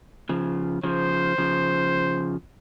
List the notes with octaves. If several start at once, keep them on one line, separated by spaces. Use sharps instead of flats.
C#3 F3
C#3 F3 C5
C#3 F3